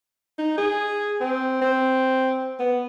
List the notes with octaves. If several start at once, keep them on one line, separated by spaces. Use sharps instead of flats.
D#4
G#4
C4
C4
B3